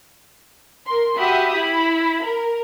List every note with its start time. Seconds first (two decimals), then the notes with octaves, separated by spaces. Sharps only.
0.87 A#4 C6
1.17 F#4 G4 E5 B5 D#6
1.55 E4 B5
2.23 A#4